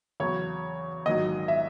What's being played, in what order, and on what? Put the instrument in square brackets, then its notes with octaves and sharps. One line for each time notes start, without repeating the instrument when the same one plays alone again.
[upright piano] E2 C#3 F#3 C#5
A#1 G#2 D#3 F#3 D#5
E5